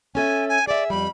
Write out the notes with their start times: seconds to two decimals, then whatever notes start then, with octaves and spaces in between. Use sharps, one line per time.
0.15 C#4 A4 E5 G#5
0.49 G#5
0.67 G#4 D5 E5
0.90 F2 G3 B5